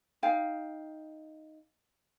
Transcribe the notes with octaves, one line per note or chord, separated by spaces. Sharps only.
D#4 F5 G5